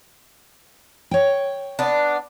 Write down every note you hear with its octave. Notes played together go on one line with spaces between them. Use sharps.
C#5 G5
B3 D4